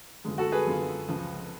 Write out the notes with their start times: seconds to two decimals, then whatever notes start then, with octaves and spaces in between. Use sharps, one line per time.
0.25 F#2 D3 G#3 B3 F4
0.38 F#4 A4
0.52 G#4 B4
0.67 F#2 D3 G#3 B3 F4
1.08 C#2 C#3 F3